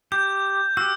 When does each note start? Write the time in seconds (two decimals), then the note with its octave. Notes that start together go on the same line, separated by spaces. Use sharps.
0.12 G4 G6
0.77 F#4 G4 E6